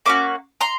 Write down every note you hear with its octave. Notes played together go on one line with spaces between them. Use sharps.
A#3 C#4 F#4 D6
A#5 C6